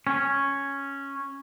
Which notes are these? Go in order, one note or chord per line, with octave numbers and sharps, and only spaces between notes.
C#4